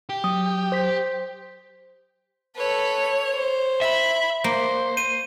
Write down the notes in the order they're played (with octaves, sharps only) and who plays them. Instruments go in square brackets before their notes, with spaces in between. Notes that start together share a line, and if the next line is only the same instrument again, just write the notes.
[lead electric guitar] G4
[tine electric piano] F#3 [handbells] D#6
[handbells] C5 B6
[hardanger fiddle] A4 B4 [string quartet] C#5
[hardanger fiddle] C5
[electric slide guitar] E5 [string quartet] B5
[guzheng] A#3 [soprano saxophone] C5
[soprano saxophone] C5 [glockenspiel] D#7